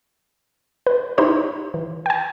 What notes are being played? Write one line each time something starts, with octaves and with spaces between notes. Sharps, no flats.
B4
D#4 E4 G4 C5 C#5
E3
G5 G#5